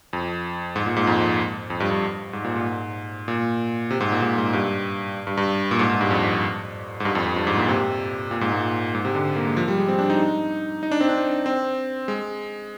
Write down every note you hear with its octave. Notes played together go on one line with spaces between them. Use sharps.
F2
G#2
A#2
G#2
F2
F2
G2
G2
G#2
A#2
G#2
A#2
C3
G#2
A#2
G#2
G#2
G2
G2
G2
A#2
G#2
G#2
G2
F2
G#2
G2
F2
F2
G2
G#2
A#2
C3
A#2
G#2
A#2
G#2
C3
D3
A#3
G#3
F3
G3
G#3
C4
D4
D#4
D#4
D4
C4
D4
C4
G#3